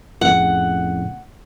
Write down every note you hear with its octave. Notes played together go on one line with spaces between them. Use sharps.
F2 A2 C#3 F#5